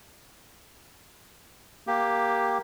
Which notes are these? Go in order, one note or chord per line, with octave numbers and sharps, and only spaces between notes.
A#3 G4